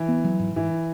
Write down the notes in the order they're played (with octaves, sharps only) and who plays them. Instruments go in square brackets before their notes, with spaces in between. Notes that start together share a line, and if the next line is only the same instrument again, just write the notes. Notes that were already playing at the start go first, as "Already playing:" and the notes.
Already playing: [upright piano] E3
[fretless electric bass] B3
F#3
G#2
[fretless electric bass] G#2 [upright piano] E3